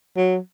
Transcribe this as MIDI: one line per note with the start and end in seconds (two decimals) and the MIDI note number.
0.17 0.38 54